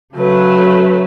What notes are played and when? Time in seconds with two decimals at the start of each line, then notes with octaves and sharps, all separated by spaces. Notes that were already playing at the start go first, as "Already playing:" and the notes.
0.15 C#3 F#3 A3 B4